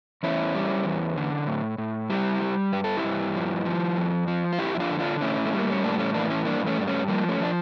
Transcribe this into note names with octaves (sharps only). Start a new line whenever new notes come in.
E2 C#4 E4
G3
E2
D3
A2
A2
G3 E4 G4
G3
G2 G4
A4
E4 G4
G2
F3
F3
F2
F3
F4
F2 E4 G4
E4
D4 F4
D3
D4 F4
A2 C#4 E4
A3
G3
A#3
C#4
A2 A#3 D4
A3 C#4
E3 A#3 D4
C#4 E4
G2 A#3 D4
A3 C#4
G2 D4
A3 C#4
F3 G3 A#3
A3 C#4
F3 D4